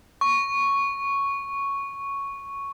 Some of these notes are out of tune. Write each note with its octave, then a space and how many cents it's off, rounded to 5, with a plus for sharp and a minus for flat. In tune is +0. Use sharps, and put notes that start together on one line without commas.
C#6 +0